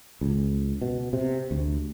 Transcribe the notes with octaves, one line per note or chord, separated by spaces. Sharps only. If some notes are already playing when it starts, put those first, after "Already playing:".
C#2
B2
C3
D2